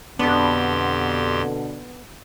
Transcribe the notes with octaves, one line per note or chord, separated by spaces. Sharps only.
F2 B2 D3 B3 D4 G4 D5 C6